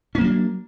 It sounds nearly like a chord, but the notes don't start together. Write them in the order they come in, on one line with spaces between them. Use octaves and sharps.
C#4 A#3 F#3 D4